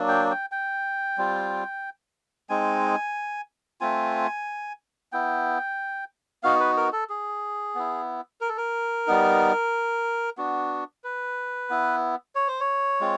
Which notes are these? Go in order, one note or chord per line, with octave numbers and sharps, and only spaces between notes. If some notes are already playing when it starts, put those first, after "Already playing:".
Already playing: F#3 A#3 D4
G5
G5
G5
G3 C4 F4
G#3 C4 D#4 G#5
A3 C4 F4 G#5
B3 E4 G5
B3 D#4 F#4 F5
B4
A#4
A4
G#4
B3 E4
A#4
A4
A#4
G3 B3 D#4
B3 D4 F#4
B4
B3 E4
C#5
C5
C#5
G#3 C4 F4